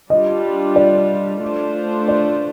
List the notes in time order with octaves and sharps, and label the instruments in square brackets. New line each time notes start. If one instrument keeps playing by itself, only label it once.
[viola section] G3 D4 F4 [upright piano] D#5
[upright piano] D5
[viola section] A3 D4 F4 C5
[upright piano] D5